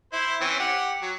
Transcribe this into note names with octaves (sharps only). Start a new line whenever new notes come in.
E4 C5
E3 C4 C#4
G4 F#5
F#3